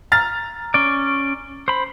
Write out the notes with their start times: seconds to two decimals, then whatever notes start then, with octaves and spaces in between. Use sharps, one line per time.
0.12 A#5 F6 A6
0.74 C#4 D5
1.68 C5 B5